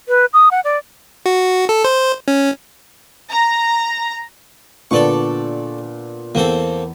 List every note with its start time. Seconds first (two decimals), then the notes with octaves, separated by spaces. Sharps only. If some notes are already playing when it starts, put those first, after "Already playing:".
0.08 B4
0.33 D#6
0.51 F#5
0.64 D5
1.26 F#4
1.69 A4
1.85 C5
2.28 C#4
3.31 A#5
4.91 A#2 D3 B3 A4 D5 C#6
6.35 E2 A#3 C4 A4